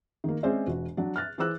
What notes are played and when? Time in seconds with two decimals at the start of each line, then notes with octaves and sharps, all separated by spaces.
0.24 D#3 A#3
0.43 G#3 C4 C#4 C5 D5 E5
0.67 E1 F#4
0.97 F#3 D4
1.16 F6 F#6 A6
1.38 E3 G#4 C5 D6 E6 F#6